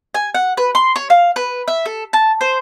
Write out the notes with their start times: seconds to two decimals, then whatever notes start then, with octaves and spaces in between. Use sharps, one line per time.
0.14 G#5
0.34 F#5
0.57 B4
0.75 C6
0.96 C#5
1.10 F5
1.36 B4
1.68 E5
1.85 A4
2.13 A5
2.41 C5